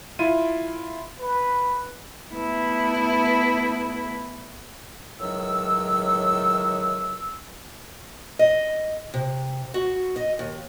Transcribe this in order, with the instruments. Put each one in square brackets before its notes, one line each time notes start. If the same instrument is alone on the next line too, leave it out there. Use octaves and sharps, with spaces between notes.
[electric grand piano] E4 F4 D#7
[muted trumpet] B4
[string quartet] A3 B3 E4
[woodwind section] C#2 A2 D#3 F#3 E6
[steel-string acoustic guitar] D#5
C3
F#4
D#5
D#2